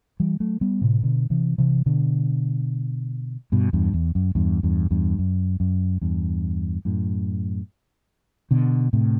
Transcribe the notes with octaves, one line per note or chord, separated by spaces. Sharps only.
E3 G3
F#3 A3
G3 B3
A2 C3
B2 D3
C3 E3
C3 E3
B2 D3
G2 B2
E2 G2
E2
F#2
E2 G2
E2 G2
E2 G2
F#2
F#2
E2 G2
F#2 A2
B2 D3
A2 C3